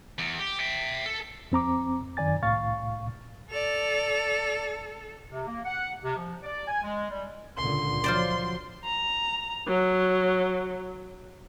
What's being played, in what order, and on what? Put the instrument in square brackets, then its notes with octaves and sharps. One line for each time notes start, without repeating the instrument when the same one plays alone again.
[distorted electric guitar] E2
G4
E5 G5
A4
[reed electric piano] F2 C4 A#5 D6
F#2 D#3 D5 G#5 A6
C2 A2 F5 C#6 A6
[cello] A4 [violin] D5 F7
[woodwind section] C3
A#3
F#5
C3
F3
D5
G#5
G#3
G3
[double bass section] C#2 A#2 D3 [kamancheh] C6
[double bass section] F3 F#3 [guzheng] F4 C5 D5
[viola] A#5
F#3